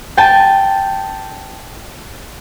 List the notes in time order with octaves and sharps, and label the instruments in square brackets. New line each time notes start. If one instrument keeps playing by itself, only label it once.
[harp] G5 A5